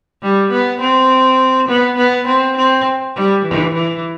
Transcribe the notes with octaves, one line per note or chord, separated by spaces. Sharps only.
G3
B3
C4
B3
B3
C4
C4
G3
E3
E3